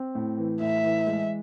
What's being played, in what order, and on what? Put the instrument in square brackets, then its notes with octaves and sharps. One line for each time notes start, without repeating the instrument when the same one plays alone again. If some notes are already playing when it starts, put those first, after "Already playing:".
Already playing: [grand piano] C4
A2
E3
[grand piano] A2 [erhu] E5
[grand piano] E3
G#3